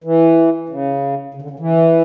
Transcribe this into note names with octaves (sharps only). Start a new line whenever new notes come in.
E3
C#3
C#3
D3
C#3
E3